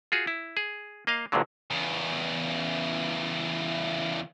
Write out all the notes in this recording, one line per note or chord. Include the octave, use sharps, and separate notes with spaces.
F4 F#4 G#4
E4
G#4
A#3 D#5 F5
G1 D2 G2 A#2 D3 F#3
E2 C#3